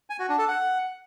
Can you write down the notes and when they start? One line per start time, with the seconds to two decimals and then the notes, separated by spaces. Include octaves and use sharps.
0.10 G#5
0.19 F#4
0.29 D4
0.39 A4
0.48 F#5